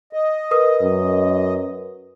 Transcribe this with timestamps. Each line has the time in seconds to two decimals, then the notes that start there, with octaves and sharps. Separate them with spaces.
0.13 D#5
0.51 A#4 B4 D#6
0.82 F#2